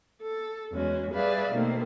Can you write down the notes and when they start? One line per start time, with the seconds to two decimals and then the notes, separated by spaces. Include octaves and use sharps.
0.21 A4
0.72 E2 G#3 C#4 F#4
1.11 G3 G#4 B4 D5 E5 F5
1.52 B2 D#3 A3 A#3 C4